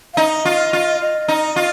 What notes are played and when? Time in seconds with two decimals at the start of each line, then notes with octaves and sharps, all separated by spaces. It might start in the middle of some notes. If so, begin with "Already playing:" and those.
0.14 F5
0.17 D#4 D#5
0.45 F4
0.73 F4
1.01 D#5
1.28 D#4
1.56 F4